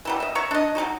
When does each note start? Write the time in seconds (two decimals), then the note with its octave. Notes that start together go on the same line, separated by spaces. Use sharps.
0.05 E3 F#3 G3
0.20 D#5 E5
0.35 C#5 E5 A#5 C#6
0.51 D4 D#5
0.75 F#3 G#3 D#4 F#4